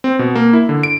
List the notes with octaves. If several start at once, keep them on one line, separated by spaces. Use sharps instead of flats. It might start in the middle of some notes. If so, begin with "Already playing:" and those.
C4
B2
A#3
E4
D3
D7